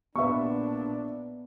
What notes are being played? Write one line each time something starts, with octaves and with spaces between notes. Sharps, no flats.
A#1 A#2 B3 D4 B4 E5 C#6